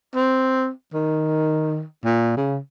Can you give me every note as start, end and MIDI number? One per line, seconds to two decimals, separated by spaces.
0.15 0.69 60
0.93 1.84 51
2.05 2.32 46
2.37 2.58 49